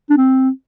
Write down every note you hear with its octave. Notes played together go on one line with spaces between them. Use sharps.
D4
C4